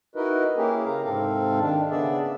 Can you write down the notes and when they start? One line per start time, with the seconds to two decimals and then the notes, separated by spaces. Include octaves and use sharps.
0.16 D#4 E4 F#4 A#4 B4 D#5
0.57 A#3 C#4 E4 G4 G#4 A#4
0.85 C#3 F5 A#5
1.04 G#2 C3 C4 A4 F5
1.59 D#3 D4
1.91 C#3 B3 D4 G#4 D5 E5